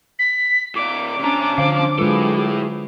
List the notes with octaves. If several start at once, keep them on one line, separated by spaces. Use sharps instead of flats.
B6
A2 D5 D6
C3 C#4 D4 A#5
D3 F3 C5 F5
F#3 G#3 E4 F4 G#4 A4 B4